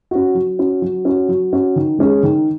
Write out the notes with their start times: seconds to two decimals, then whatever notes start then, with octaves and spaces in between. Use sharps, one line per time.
0.11 C#4 F#4
0.35 F#3
0.59 C#4 F#4
0.82 F#3
1.05 C#4 F#4
1.29 F#3
1.53 C#4 F#4
1.76 D#3
1.99 G#3 C#4 G#4
2.23 D#3